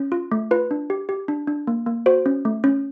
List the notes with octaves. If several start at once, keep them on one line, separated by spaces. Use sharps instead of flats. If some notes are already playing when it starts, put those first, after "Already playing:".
Already playing: C#4
F4
A3
F4 B4
D4
G4
G4
D4
D4
A#3
A#3
F#4 C5
C#4
A3
C#4